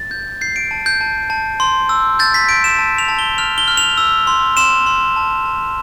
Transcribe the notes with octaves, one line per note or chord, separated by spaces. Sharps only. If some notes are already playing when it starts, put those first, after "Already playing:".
Already playing: A6
G6
G6 C7
D7
A5
G6
A5
A5
C6
E6
G6 A6
B6
G6 D7
E7
A5
F7
A5
G7
F6 F7
G7
F6
F7
E6
C6
C6 E7
C6
A5
A5